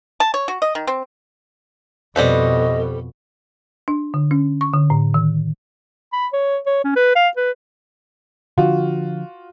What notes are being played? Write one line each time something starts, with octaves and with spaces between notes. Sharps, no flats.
A5
C#5
F#4
D#5
D#3
C4
F2 B2 G3 C4 A4 B4 D#5
D4
D3
C#4
C#6
D3
A2
D#3
B5
C#5
C#5
C#4
B4
F5
B4
D3 F3 F4 F#4